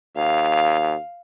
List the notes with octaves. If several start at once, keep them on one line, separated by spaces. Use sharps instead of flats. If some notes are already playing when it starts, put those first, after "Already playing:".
D#2 F5